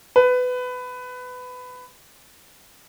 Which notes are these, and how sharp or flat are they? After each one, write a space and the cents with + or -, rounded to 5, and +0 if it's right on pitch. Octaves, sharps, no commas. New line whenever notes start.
B4 +20